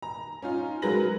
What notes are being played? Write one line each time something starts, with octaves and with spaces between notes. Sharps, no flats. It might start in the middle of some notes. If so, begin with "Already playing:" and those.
A#5
C#4 D#4 F4
F#3 G#3 A#4 B4 A#6 F#7